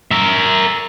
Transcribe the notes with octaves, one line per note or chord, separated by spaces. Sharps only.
A#4 E5